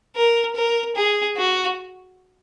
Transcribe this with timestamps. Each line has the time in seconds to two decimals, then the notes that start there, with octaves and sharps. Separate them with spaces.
0.16 A#4
0.56 A#4
0.96 G#4
1.37 F#4